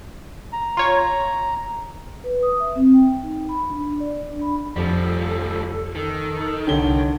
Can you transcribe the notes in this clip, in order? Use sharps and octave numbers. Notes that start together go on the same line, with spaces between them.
A#5
F4 C#5
B4
D#6
E5
C4
G5
D#4
B5
D4
D5
D4
B5
F2 F3 G3 A4
D#3 A4
C2 D3 C#5 G5 G7